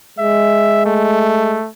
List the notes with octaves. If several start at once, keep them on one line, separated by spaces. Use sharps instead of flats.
G#3 E5
A3